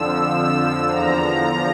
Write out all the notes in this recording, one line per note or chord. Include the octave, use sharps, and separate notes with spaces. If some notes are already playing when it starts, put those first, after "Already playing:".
Already playing: F2 D3 F3 E6
E2 D3 F3 A#5